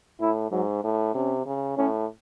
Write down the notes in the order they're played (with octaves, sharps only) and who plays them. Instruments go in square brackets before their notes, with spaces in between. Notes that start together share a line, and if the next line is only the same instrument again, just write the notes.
[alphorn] A2 [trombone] E4
[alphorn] G#2 [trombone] F#3
[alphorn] A2
[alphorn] C3 [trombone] C#4
[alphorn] C#3
[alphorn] A2 [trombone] C#4